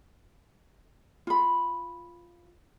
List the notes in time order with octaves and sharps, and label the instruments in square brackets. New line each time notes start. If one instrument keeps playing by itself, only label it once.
[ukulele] F4 B5